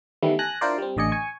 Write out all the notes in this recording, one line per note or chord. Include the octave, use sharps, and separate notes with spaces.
D#3 E3 G3 A3 B3 E4
G#5 A5 F#6 A#6
D4 E4 F4 A#4 C5 D5
G3 C4
A1 D3 D5 D#5 G#5 C#7
G#5 C#6